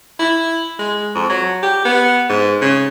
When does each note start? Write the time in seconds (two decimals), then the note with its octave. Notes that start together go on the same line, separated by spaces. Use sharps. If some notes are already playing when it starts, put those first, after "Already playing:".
0.19 E4
0.79 G#3
1.15 F2
1.30 F#3
1.63 G4
1.85 B3
2.30 G#2
2.61 C#3